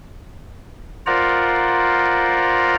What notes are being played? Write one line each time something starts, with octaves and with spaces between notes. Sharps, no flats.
F4 A#4 C5 D5 F#5 A#5